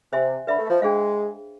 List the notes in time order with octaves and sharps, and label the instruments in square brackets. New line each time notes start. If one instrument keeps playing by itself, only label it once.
[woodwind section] C3 [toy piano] C5 E5 G#5 C6
[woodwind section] D3 [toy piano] B4 E5 B5
[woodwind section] A3
F3
[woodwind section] G#3 [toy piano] D4 G#4 C5 F5